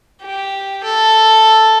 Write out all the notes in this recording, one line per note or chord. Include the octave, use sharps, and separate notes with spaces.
G4
A4